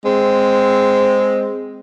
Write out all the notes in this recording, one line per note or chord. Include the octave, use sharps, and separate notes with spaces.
G#3 C4